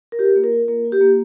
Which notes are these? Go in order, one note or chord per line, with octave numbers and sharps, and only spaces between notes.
A#4
F4 G4
A#3
A#4
F4
A#3 A#4
F4
G4
A#3